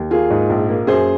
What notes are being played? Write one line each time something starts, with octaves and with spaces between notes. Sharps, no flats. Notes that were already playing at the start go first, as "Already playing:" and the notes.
Already playing: D#2
A#3 F4 G#4
G#2
A#1
A#3
F#2 G#4 C5